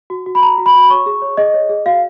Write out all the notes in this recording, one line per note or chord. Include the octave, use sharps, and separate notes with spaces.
F#4
F#4
B5
F#4 A#5
F#4
B5
F#4
C#5 C#6
G#4
C#5
G#4 D#5
C#5
G#4
F#4 F5